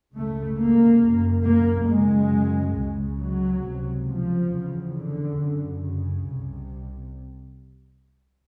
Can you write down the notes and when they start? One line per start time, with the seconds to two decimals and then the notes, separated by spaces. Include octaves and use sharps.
0.15 C#2 C#3 A3
0.60 A#3
1.02 F#2 C#3
1.47 A#3
1.89 F#2 C#3 G#3
2.77 C#2 C#3
3.20 F#3
3.64 C#2 C3
4.08 F3
4.52 E2 C#3
4.95 D3
5.39 F#2 C#3
5.82 C#3
6.25 C2 C3